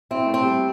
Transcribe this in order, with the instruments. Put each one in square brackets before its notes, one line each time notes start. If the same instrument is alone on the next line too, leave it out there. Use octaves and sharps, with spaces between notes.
[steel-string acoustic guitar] C4 [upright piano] E4
[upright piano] A3
[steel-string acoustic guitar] C4
[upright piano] G3